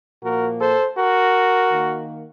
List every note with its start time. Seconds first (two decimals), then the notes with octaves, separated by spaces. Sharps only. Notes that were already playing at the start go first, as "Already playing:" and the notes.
0.23 A#2 F3 A#3 F#4 A#4
0.60 A4 C5
0.97 F#4 A#4
1.72 D#3 A#3